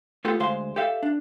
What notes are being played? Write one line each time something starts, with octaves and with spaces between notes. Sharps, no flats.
A3 B3 F4 G4 A4
D2 G#3 C5 F5 C6
G4 A4 E5 F5
D4